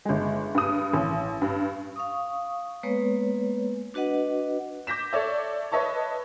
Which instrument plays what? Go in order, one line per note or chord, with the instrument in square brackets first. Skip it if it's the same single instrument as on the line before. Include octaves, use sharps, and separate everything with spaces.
[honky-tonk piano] G1 G#3
G2 D#6
A1
G2
[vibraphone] F5 C#6 D#6
G#3 A#3 B3 B4 C#5
D4 F#4 B4 D#5 F#5
[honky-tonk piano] D6 G6 A#6 B6 E7
A4 C#5 D5 E5
B4 C#5 D#5 E5 A5 C#6